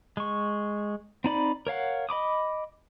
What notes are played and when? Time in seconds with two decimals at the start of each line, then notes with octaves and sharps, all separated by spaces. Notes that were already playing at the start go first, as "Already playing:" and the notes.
0.17 G#3 C#6
1.24 C4 D#4 D5 B5
1.67 A#4 C#5 F5 F#5
2.09 D#5 B5 D6 D#6